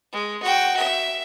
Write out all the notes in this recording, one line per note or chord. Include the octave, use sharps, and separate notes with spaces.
G#3
F#4 G5
E5